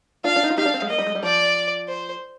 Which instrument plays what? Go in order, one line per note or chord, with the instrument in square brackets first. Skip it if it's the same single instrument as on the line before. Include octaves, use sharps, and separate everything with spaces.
[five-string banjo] D4 F4 [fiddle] F5
[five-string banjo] D4
D#4
F4
[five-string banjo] D#4 G4 [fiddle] F5
[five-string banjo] D4
C4
G#3
[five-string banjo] A#3 [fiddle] D#5
[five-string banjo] G3
G#3
G3
[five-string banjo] F3 [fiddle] D5
[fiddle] C5